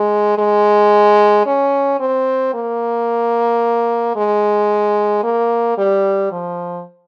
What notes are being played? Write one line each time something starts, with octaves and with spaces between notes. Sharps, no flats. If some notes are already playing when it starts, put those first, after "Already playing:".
Already playing: G#3
G#3
C#4
C4
A#3
G#3
A#3
G3
F3